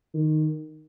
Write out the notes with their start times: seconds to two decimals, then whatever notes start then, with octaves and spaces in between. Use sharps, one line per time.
0.14 D#3